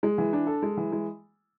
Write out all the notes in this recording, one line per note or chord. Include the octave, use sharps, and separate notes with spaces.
G#3
E3
D4
A4
G#3
E3
G#3